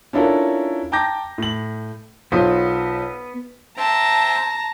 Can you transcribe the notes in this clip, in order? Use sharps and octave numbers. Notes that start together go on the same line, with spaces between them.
C#4 D4 E4 F4 A4 A#4
G5 A5 A#5 D6 G6 A#6
A2 F#7
B1 B3 F4 C5 D#6
C5 E5 G5 A5 A#5